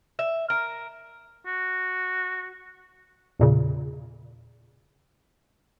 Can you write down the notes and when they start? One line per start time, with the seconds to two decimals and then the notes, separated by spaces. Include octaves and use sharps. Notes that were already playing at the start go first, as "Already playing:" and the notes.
0.19 E5
0.50 A#4
1.46 F#4
3.39 E2 A#2 C#3